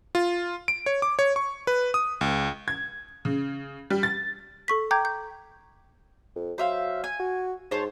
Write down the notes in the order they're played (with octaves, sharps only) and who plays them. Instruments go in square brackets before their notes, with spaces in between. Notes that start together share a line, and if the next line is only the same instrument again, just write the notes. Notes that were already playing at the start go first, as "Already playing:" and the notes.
[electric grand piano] F4
D7
C#5
D6
C#5
C#6
B4
D#6
C#2
[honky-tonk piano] G#6
C#3
G3
A6
[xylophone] A4 C#6 B6
G5 A#5 D6 G6 G#6
G6
[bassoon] F2
[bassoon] F#3 [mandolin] C5 E5 F5
[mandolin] G#5
[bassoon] F#4
[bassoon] G#2 [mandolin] C5 C#5 A5